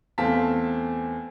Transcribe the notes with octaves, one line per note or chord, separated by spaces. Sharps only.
E2 A3 C4 F5 A5 B6